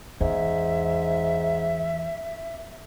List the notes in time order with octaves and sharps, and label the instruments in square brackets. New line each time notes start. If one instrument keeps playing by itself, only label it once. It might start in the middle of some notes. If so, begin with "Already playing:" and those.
[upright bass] E2 [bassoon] G#2 [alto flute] E5